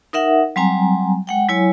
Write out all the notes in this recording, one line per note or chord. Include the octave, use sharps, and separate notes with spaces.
D#4 A#4 E5 F#5
F#3 G3 C4 G#5 A#5
G#3 F#5 G5
F#3 E4 C#5 G#5